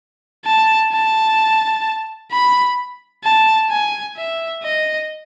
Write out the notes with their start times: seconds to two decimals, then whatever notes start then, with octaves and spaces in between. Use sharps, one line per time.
0.45 A5
0.92 A5
2.31 B5
3.24 A5
3.70 G#5
4.17 E5
4.63 D#5